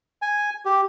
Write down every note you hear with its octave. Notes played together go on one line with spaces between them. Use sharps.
G#5
G4